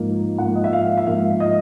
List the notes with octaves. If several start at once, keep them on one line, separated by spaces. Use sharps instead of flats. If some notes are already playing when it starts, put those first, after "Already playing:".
Already playing: G#2 F3 A#3 D#4
G#2 F3 A#3 F#5
D#5
E5
F5
E5
G#2 F3 A#3 F5
D#5